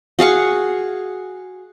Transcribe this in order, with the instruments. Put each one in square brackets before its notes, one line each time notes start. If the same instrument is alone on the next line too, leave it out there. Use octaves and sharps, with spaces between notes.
[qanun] F#4 G#4 F5 C#6